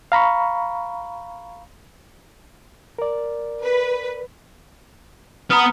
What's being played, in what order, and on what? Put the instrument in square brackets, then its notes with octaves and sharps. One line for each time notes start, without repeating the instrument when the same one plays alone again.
[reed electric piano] F5 A#5 B5 C#6
A#4 D5
[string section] B4
[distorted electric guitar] B3 [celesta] A#5 D#6 F6